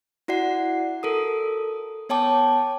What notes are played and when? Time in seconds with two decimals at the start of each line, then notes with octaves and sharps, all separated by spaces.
0.28 E4 F#4 D5 F#5 C7
1.03 A4 A#4 D#6
2.09 B3 C#5 G5 A5 D6